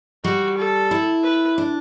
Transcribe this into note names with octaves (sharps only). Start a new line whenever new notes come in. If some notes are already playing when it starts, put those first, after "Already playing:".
G3 F#4
A4
E4
B4
D4